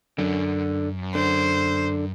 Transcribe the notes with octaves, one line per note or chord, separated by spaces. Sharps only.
F#2 D3
D3 C5